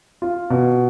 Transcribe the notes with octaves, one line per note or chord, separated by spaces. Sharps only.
F4
B2